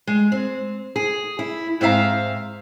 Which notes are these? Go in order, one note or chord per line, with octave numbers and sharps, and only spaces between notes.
G#3
C4
G#4
E4
G#2 C4 E5 F5 A#5